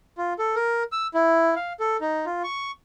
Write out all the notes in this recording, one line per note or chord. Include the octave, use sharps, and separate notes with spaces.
F4
A4
A#4
E6
E4
F5
A4
D#4
F4
C#6